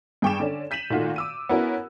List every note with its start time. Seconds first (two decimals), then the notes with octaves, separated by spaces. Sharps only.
0.22 G2 G#4 G5 C#6 D6 E7
0.40 D3 C#4 D5
0.71 G6 B6 D#7 E7 F#7
0.90 A#2 D#3 A3 F4 F#4
1.16 D6 E6 D#7
1.49 B3 C#4 E4 F#4 A#4